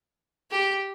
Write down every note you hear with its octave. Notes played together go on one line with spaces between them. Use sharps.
G4